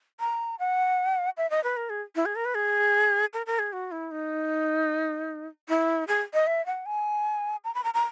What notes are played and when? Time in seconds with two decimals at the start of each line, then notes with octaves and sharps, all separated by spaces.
0.20 A#5
0.59 F#5
1.37 E5
1.50 D#5
1.64 B4
1.77 A#4
1.90 G#4
2.15 E4
2.25 G#4
2.35 A#4
2.45 B4
2.55 G#4
3.33 A#4
3.46 A#4
3.59 G#4
3.73 F#4
3.91 E4
4.11 D#4
5.69 E4
6.08 G#4
6.34 D#5
6.47 E5
6.66 F#5
6.86 G#5
7.64 A#5
7.75 B5
7.84 A#5
7.94 A#5